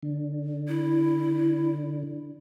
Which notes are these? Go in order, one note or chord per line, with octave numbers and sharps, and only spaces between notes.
D3
E4